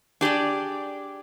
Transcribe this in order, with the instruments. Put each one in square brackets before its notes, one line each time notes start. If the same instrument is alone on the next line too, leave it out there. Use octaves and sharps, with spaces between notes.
[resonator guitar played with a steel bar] D4 G4 G#4 D5